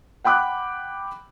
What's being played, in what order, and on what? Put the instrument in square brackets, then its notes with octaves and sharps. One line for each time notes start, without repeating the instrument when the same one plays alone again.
[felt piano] F#5 G5 B5 D6 F#6